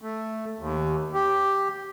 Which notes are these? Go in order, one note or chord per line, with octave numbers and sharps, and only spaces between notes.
A3
D#2
G4